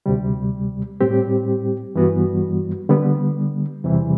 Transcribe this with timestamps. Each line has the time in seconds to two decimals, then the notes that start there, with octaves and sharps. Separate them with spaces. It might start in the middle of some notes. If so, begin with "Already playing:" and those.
0.06 D2 C3 G3
1.01 A2 G3 C4 G4
1.95 G2 E3 G3 B3 F#4
2.89 D3 G3 B3
3.84 E2 C3 E3 G3